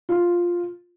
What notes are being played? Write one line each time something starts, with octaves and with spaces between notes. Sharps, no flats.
F4